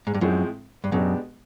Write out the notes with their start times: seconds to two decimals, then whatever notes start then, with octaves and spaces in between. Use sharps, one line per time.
0.07 G#2
0.14 G2
0.21 F#2 A2 F3 G#3 C4
0.84 G2
0.92 F#2 B2 G#3 B3 D4 G4